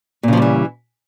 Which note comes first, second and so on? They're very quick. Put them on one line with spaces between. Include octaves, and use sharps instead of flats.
A#2 C#3 F3 G3 E3